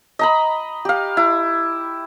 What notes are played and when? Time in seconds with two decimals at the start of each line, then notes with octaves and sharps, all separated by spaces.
0.19 D#5 A#5 B5
0.85 G4 F5
1.17 E4